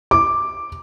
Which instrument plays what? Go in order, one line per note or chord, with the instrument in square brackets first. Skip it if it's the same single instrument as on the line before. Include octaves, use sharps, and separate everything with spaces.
[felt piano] D6